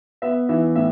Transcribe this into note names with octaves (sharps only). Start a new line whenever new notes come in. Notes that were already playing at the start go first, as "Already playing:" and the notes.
B3 E5
E3 E5
A2 E5